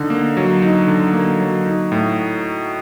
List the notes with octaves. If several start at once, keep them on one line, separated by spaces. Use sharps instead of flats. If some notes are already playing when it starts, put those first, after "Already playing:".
Already playing: D3 D#4
A#3
F#3
D#4
D3
A#3
F#3
D#4
A2